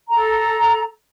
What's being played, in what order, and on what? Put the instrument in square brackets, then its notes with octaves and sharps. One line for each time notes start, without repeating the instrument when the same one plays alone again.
[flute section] A4 A#5